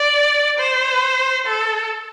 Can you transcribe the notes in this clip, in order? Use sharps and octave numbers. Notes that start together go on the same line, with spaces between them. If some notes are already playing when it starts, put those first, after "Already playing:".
Already playing: D5
C5
A4